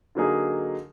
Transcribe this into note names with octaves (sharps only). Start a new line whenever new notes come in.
D3 F#3 A#3 D#4 G#4